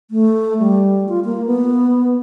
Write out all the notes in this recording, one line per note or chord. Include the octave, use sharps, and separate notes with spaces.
A3
G3
F4
A#3
B3